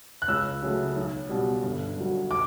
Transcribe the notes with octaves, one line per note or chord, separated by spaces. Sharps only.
F#6
C#2 E6
C#3 F#3 A3
B1
B2 G3
G1
G2 F#3
D6